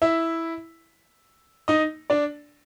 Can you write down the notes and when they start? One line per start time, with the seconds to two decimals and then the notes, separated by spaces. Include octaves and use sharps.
0.02 E4 E5
1.68 D#4 D#5
2.10 D4 D5